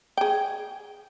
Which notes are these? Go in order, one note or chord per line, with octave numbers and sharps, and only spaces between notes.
G#4 G5